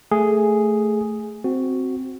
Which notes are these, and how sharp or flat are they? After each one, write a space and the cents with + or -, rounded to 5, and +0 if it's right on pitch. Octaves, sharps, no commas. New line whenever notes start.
A3 +0 G#4 +0
C4 +0 F#4 +0